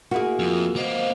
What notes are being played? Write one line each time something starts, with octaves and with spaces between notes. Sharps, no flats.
A#3 E4 F#4 G#4
F2 F4
A#3 B3 C5 D#5 F5